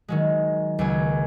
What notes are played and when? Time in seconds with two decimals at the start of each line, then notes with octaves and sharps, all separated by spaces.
0.08 D#3 F#3 G#3
0.79 C#2 F#3 A#3 G#5